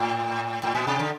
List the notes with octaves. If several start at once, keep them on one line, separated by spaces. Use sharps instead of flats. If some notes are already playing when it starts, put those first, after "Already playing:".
Already playing: A2
A2
A#2
C3
D3